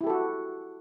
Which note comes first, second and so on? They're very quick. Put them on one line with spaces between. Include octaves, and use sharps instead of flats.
E4 G4 A4 F#4